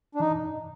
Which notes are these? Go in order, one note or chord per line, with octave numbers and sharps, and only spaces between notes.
D4
E3 D#4